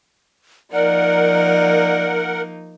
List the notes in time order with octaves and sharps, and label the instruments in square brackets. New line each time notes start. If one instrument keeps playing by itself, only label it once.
[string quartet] F3 A#3 D#4 [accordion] A#4 F#5 [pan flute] D5